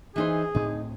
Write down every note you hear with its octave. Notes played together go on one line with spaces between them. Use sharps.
E3 D#4 G#4 C5
D2 A2 C4 D#4